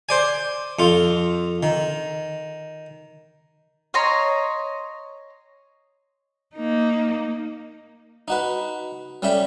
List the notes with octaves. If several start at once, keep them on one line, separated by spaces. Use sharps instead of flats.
C5 D5 G#5
F2 F4
D#3
C#5 D#5 A#5 C6
A#3 D#4
D#4 F#4 B4
G3 C#4 A4 E5 G5